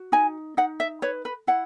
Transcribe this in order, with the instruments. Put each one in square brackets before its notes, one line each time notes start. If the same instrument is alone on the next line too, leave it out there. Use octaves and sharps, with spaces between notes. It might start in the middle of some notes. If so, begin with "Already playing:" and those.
Already playing: [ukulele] F#4
D#4 G#5
D#4 F#5
E5
B4 C#5
B4
E4 F#5